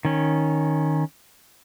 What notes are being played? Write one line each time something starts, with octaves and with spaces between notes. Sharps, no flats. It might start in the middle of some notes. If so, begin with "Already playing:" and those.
D#3 C#4